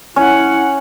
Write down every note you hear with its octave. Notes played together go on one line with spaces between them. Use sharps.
C#4 E4 F#5